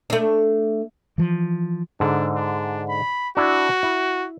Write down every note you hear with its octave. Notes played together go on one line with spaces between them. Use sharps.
A3 D4
E3 F3
G#2 D3 D4
D4
B5
D4 E4 F#4
E4